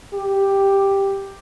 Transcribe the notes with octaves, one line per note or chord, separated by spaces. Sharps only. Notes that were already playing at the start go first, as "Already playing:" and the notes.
G4